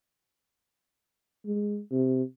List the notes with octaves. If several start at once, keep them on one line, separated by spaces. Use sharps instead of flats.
G#3
C3